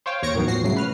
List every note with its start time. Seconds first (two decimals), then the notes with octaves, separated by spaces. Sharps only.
0.06 C5 C#5 F5 G5
0.22 D#2 C#5 C#6 A#6 C#7 D7
0.34 A2 D#3 E3 F#3 B3
0.47 E2 A2 F3 F#4 A#6 C7
0.64 C2 A2 C#3 F#3 A3 C7
0.77 B4 F6